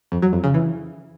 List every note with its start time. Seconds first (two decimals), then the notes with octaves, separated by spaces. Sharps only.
0.12 F2
0.22 F#3
0.33 F2
0.44 C#3
0.54 E3